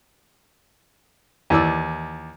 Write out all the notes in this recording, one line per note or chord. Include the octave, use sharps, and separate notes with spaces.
D#2 E3 D5 E6